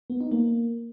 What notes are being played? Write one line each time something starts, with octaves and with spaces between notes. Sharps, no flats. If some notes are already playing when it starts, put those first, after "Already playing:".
B3
D#4
A#3